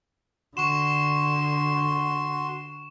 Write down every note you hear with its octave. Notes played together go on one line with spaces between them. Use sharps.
D3 F#4 C6 C#6 E7